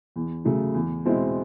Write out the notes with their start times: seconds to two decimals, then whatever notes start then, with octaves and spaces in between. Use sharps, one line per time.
0.16 E2
0.45 C#3 F#3 A3
0.74 E2
1.05 B2 G#3 C4 E4